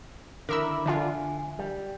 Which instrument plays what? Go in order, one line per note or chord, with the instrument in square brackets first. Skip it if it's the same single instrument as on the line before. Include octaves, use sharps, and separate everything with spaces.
[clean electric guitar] D3 D#3 E4 [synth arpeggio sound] A#4 E5 E6
[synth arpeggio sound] D3 D4 F4 [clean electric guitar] E5 G#5
[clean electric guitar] G3